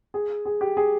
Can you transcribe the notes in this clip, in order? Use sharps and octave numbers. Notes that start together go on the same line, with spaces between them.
G#4
G#4
G4
G#4